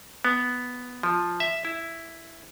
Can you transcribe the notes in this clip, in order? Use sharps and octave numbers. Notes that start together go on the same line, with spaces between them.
B3
F3
E5
E4